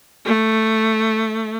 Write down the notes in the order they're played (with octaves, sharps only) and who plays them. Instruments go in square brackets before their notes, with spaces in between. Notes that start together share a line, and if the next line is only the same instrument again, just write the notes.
[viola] A3